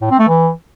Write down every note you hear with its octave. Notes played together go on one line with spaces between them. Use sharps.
A2
C4
A3
E3